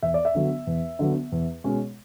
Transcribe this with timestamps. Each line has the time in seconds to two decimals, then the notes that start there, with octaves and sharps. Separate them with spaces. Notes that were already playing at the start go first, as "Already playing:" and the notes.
0.03 E2 E5
0.14 D5
0.25 E5
0.35 D3 F#3 B3
0.67 E2
0.99 D3 F#3 B3
1.32 E2
1.64 B2 G#3 C#4